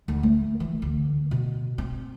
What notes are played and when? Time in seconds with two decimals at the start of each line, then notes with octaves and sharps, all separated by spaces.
0.08 D2
0.23 A3
0.60 E3
0.82 D2
1.31 B2
1.78 C4